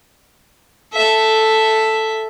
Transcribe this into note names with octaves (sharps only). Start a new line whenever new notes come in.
A4 E5